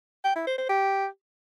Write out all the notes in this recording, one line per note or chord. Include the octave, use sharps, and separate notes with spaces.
G5
E4
C5
C5
G4